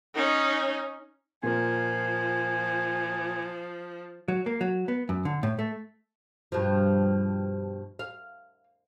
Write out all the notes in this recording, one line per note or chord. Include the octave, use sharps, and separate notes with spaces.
C#4 D#4
A#2 F3 A#3 G#5
F#3
A#3
F#3
B3
F#2
D3
A2
A3
G2 B2 F3
F5